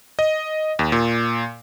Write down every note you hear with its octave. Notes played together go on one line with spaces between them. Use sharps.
D#5
D#2
A#2